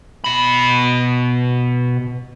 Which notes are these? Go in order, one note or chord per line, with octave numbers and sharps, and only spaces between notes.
B2 B5